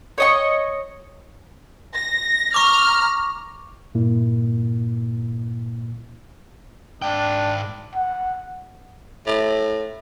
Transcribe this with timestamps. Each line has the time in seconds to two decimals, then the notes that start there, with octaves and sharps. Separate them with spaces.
0.18 C#5 D#5 C#6
1.94 A#6
2.54 A#5 C#6 D6 F6
3.95 G2 A#2 A#3 E4
7.02 G#2 D4 G5
7.95 F#5
9.27 A2